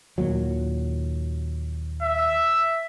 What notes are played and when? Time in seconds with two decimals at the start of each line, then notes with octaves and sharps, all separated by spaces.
0.18 D#2 A#2 F#3
2.03 E5